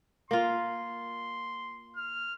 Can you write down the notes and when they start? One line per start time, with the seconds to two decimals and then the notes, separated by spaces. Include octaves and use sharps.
0.31 A#3 F4 C6
1.96 F6